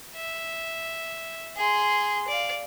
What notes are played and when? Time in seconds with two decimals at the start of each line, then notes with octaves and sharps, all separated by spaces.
0.15 E5
1.56 G#4 C6
2.28 D5 F5